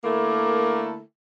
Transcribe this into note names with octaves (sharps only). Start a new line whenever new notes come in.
D3 A3 A#3 E4 A4 A#4